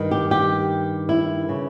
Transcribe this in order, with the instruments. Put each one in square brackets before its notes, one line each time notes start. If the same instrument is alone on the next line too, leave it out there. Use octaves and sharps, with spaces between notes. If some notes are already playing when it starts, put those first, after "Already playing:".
Already playing: [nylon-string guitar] G2 D#3
G4
G4
E4
C#3 E3